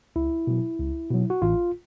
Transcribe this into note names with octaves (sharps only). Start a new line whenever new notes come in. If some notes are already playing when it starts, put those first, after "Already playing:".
C#2 E4
B2 F#3
C#2
B2 F#3
F#4
A1 F4